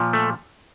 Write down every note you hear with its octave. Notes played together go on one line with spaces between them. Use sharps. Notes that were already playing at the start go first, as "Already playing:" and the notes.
Already playing: A#2 F3
A3